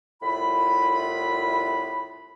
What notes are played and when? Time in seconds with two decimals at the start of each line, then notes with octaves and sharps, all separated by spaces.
0.22 C2 A2 F4 B5